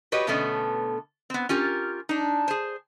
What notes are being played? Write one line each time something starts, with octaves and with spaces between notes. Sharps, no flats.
F#4 G4 B4 C#5 D#5
B2 D3 A3 B3 C#4
B3 C4
C#4 F4 G4 A#4
D4 D#4
G#4 C5